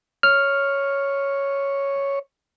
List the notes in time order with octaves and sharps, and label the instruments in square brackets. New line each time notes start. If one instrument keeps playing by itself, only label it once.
[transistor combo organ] C#5 [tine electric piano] F6